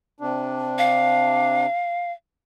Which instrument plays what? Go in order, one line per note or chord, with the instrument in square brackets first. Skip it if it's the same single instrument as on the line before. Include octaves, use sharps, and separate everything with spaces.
[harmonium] C3 D4
[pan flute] F5